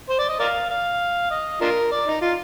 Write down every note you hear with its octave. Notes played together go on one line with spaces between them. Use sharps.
C5
D5
D#5
A#4 D5 F5
F5
D#5
D4 F4 A#4
D5
D#4
F4